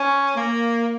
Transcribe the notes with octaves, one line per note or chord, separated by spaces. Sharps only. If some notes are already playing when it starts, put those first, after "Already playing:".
Already playing: C#4
A#3